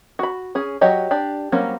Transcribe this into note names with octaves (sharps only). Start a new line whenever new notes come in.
F#4 B5
C#4 G#4
F#3 F#4 G4 C#5 D#5
D4 G4 D5
F#3 G3 A#3 C4 C#4